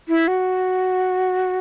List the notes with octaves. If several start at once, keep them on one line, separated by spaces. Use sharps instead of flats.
E4
F#4